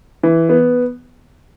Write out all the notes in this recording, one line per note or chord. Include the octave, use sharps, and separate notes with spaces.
E3
B3